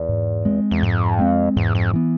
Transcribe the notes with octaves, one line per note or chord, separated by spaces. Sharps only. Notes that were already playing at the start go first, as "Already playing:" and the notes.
Already playing: E2
G#2
G#3 C4
E2
F2 G#2
G#3 C4
E2 G#2
F2
E3 B3